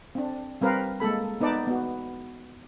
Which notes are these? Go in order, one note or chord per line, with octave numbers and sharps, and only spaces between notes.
C4 D4
G3 C4 A#4 B4 F5
G#3 A#3 A4 B5
B3 D#4 B4 D5 A5
B3 F#4